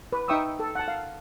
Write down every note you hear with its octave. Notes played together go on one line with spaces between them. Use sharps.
B4
D#4 E5 G5 C#6 D#6 E6
A4
F#5 A5
F5